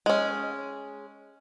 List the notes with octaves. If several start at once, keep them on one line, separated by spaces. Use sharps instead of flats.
G#3 C#4